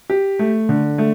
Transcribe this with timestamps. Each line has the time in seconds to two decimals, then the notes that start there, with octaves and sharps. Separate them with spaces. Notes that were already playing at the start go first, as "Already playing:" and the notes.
0.10 G4
0.39 A3
0.69 D3
0.98 A3